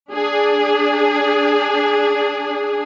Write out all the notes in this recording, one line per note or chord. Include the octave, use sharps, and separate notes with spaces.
D4 G#4